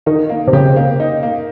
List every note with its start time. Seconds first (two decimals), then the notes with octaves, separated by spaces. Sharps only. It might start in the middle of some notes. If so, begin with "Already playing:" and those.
0.06 D#3 D#4
0.29 A#3
0.48 C3
0.53 C#3 G4
0.76 A#3
1.00 D#4
1.23 A#3